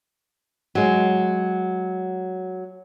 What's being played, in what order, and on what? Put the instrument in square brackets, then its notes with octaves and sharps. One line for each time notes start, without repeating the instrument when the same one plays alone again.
[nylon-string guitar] F#3 G#3